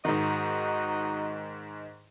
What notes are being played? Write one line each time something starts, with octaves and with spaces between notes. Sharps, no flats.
G#2 D#3 D#4 F#4 D#5